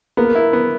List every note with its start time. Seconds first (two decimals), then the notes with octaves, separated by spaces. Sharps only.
0.17 A#3 B3 A#4
0.35 E4
0.53 B3